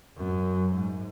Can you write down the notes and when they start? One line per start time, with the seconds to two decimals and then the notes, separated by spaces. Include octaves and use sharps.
0.17 F#2
0.73 G#2